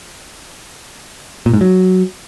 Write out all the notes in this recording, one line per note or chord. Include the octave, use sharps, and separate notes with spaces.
A#2
G#2
F#3